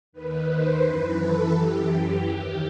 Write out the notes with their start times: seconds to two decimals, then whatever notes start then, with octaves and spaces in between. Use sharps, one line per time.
0.13 D#2 D#3 B4
0.48 C5
0.82 F#2 E3 B4
1.19 A4
1.54 F#2 E3 G4
1.89 G4
2.25 D#2 D#3 G4